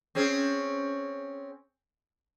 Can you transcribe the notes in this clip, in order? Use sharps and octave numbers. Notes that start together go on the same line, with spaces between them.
C4 C#4 G#4